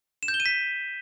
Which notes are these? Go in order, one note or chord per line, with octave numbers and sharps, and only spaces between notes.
E7
G6
G7
D#7
B6